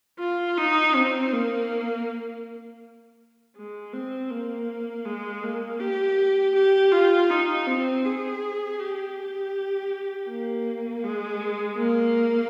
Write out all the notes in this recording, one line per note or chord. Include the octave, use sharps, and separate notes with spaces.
F4
D#4
C4
A#3
G#3
C4
A#3
G#3
A#3
G4
G4
F4
D#4
C4
G#4
G4
A#3
G#3
A#3